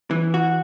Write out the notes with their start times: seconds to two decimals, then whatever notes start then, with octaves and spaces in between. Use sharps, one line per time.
0.11 E3
0.34 F#4